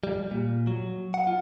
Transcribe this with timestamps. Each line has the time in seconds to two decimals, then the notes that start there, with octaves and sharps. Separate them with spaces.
0.04 G3
0.31 A#2
0.67 F#3
1.14 F#5
1.27 F4